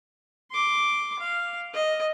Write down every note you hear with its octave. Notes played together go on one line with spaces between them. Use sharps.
C6 D6
F5
D#5